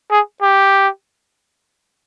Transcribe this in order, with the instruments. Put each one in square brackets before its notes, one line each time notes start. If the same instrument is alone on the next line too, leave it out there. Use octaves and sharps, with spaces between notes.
[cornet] G#4
G4